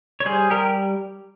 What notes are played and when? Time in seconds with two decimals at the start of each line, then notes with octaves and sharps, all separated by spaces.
0.20 C#5
0.25 G3 G#4 C5
0.50 G3 G4 A#4